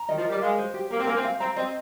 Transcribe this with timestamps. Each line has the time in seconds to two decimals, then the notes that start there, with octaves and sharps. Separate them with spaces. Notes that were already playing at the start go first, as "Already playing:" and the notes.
Already playing: A#5
0.09 D#3 D#5
0.17 F3
0.25 G3 A#4
0.42 G#3 F5
0.58 C5
0.74 G4
0.91 A#3 A#4
0.99 C4
1.07 A#3 G#5
1.16 C4
1.24 F5
1.40 C4 A#5
1.56 C4 D#5